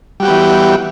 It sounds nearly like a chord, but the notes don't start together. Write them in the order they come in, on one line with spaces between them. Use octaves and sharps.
G3 F#4 G4 B3 E3